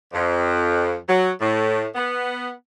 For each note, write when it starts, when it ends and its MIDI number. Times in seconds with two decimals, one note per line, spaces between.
0.13 0.94 41
1.08 1.29 54
1.41 1.85 45
1.95 2.50 59